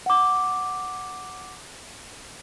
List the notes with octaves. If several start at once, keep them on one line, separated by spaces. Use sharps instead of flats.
F#5 D6